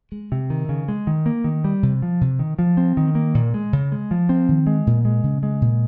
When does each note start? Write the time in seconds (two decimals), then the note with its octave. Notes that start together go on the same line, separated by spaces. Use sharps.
0.12 G#3
0.32 C3
0.50 D#3
0.69 C#3
0.88 G#3
1.07 D#3
1.26 A#3
1.44 D#3
1.64 G3
1.83 C3
2.02 F3
2.21 C3
2.39 D#3
2.59 F3
2.77 C4
2.97 D#3
3.15 A#3
3.35 A#2
3.54 G#3
3.73 C#3
3.92 G#3
4.11 F3
4.29 C4
4.49 D#3
4.67 G#3
4.87 A#2
5.05 G#3
5.24 C#3
5.43 G#3
5.61 A#2